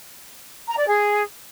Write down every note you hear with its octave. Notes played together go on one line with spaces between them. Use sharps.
A#5
D5
G#4